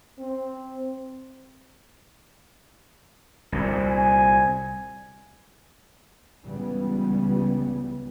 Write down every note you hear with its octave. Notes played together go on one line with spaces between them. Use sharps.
C4
C2 A#2
G#5
C#2 C#3 E3 G3 B3